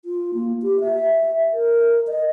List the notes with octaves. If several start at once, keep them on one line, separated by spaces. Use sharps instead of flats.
F4
A#3
G4
E5
A#4
D#5